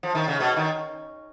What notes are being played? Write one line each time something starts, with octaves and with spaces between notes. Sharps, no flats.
F3
D#3
C#3
B2
D#3